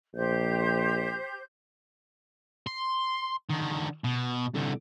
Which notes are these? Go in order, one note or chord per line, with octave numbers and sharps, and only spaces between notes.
A#1 G4 C5 G6
C6
D3 D#3
B2
C2 D3